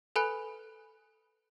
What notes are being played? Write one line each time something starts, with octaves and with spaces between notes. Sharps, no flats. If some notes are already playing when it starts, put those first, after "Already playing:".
A4 B4 G#5 B5 F#6 C#7